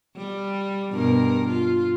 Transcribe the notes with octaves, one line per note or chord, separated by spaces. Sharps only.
G3
G2 B2 A#4
F4